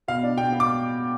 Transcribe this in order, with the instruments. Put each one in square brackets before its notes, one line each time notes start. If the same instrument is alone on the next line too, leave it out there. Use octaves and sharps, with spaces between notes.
[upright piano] B2 [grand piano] F5
[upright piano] D4
[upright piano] B2 [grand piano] G5
[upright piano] B3
[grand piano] D6